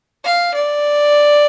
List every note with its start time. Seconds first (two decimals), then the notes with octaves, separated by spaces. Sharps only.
0.25 F5
0.55 D5